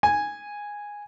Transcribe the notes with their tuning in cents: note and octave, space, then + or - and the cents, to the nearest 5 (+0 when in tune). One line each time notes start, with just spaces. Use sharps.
G#5 -10